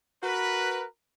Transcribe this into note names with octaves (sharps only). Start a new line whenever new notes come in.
F#4 A#4 B4